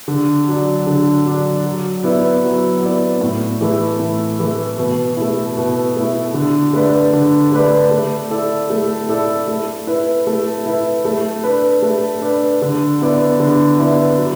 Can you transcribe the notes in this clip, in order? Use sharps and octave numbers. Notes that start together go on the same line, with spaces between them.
D3
F#3 D4
D3
F#3 D4
F#3
B3 E4 D5
F#3
B3 E4 D5
A2
E3 A3 E4
A2
E3 A3 E4
B2
A3 E4
B2
A3 E4
D3
A3 D4 B4 D5
D3
A3 D4 B4 D5
A3
E4 A4 D5
A3
E4 A4 D5
A3
E4 B4
A3
E4 B4
A3
D4 B4
A3
D4 B4
D3
B3 E4 D5
D3
B3 E4 D5
F#3